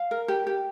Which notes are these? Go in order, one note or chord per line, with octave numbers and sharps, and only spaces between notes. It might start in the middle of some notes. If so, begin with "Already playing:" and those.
Already playing: F5
A#4
G4
G4